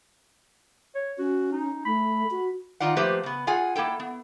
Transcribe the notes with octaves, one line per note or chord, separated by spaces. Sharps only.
C#5
C#4 F#4
D#4
A3 B5
F#4
D#3 D#4 F4 D5 F#5
F3 A3 A#3 G4 B4 C5
C#3 B3
F4 G#4 F#5 G#5
A#3 E4 A4 G5
B3